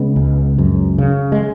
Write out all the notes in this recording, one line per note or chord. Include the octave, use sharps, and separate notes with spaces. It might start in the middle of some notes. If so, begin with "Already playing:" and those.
Already playing: C#3 G#3 B3
C#2
F#2
C#3
G#3